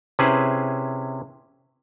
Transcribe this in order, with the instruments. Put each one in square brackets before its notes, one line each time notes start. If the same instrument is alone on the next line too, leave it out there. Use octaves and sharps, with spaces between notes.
[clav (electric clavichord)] C3 C#4 E4 G#4 B4 C5